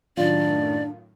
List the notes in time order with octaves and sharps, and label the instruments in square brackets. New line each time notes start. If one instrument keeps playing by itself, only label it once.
[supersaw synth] F#2 A2 D#3 [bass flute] D4 [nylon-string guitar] F4 [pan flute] D5